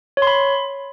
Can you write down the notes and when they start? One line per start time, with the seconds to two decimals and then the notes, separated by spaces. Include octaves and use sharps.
0.17 C#5
0.22 C6
0.27 B5